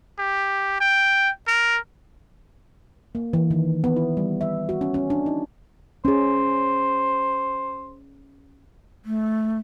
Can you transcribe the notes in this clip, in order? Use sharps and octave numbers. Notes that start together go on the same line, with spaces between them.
G4
G5
A#4
A#3
E3
D#3
B3
E4
G3
E5
F#4
C#4
C#4
D4
D#4
C#4 G#4 C5
A3